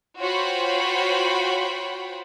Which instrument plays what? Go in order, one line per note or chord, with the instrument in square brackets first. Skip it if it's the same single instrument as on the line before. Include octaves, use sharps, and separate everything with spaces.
[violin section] F4 F#4 C5 C#5 G5 B5